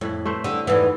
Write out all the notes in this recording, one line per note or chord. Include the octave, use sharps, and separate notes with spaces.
F2 A2 E4
A3 B4 C5
D3 G3
F2 G#2 D3 E3 B3